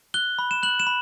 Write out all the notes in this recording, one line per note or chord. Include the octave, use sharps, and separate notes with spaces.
F#6 G7
B5
E7
F#6 F#7
E7
B5